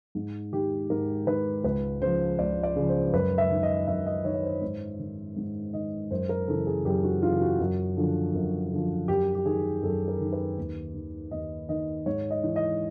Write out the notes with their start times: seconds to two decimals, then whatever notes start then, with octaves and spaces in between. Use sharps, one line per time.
0.15 G#2
0.53 D#3 G4
0.90 G#2 A#4
1.27 D#3 B4
1.64 C#2 B4
2.01 C#3 F3 C5
2.39 C#2 D5
2.63 D5
2.76 C#3 F3
2.89 C5
3.13 F#2 B4
3.38 E5
3.50 D#3
3.63 D#5
3.87 F#2 E5
4.06 D#5
4.24 D#3 C#5
4.34 C#5
4.43 C5
4.62 G#2
4.99 D#3
5.37 G#2
5.74 D#3 D#5
6.11 F#2 C5
6.29 A#4
6.48 C#3 E3 A4
6.67 G#4
6.85 F#2 G4
7.04 F#4
7.22 C#3 E3 F4
7.41 F#4
7.60 F#2
7.97 D3 F3
8.34 F#2
8.72 D3 F3
9.08 F#2 G4
9.35 G4
9.46 D#3 G#4
9.83 F#2 A4
10.08 A#4
10.21 D#3
10.33 B4
10.57 D#2
10.94 D#3
11.31 D#2 D#5
11.69 D#3 D#5
12.06 G#2 C#5
12.31 D#5
12.44 E3
12.56 D#5